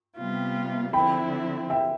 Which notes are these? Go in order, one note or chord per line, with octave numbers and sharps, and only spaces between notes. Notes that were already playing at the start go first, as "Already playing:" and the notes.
C3 G3 B3 F4
D3 F3 C4 E4 G5 B5
E5 G5